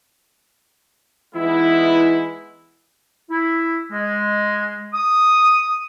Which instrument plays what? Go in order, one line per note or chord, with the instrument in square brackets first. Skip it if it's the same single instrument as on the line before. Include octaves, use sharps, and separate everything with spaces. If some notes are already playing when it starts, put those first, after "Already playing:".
[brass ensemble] E3 G#3 B3 D#4 E4
[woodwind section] E4
G#3
D#6